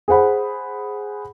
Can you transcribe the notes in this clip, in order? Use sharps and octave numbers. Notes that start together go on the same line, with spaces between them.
G#4 C5 F#5 B5